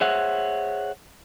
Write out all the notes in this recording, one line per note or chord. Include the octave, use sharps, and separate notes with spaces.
G#4 C5 C#5 E5 F#5